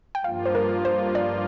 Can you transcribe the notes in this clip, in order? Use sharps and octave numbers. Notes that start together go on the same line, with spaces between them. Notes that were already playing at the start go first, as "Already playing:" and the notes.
G5
G2 F3 A#3 F4 F5
C5
A#4
C5
D5